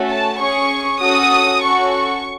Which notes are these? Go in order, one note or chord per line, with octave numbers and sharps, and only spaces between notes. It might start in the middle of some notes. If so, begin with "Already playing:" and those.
Already playing: A3 C#4 F#4 A4
A5
C#4 G#4 C#6
C#4 F#4 A4 D#6
C#4 F#4 A4 C#6
C#6